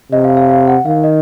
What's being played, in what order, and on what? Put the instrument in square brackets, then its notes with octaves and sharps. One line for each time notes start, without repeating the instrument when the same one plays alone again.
[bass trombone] C3 [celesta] D#5
[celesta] F5
F5
F5
F#5
[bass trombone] D#3 [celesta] F5
[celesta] D#5